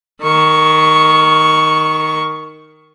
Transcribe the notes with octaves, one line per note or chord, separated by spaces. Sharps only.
D#3 C#6